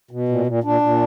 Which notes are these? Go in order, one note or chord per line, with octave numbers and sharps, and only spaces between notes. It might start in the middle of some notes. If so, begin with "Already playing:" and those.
B2
A#2
A#2
A#2 D4
A#2